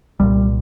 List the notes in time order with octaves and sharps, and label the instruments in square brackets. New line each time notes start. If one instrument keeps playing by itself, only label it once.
[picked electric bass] C2 A#2 G3